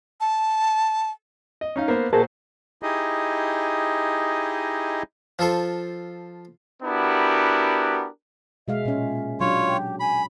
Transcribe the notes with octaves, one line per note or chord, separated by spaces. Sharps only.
A5
D#5
C#4 D#4 F5
A#3 B3 C5
A#2 F#4 G#4 A#4 C5 A5
D#4 E4 G4 G#4 D#5
F3 F4 A4 C5
B3 D4 E4 F#4 G4 A#4
B2 G#3 E5 F5
A#2 C#4
F#3 D4 F4 C#5
G4
G#5 B5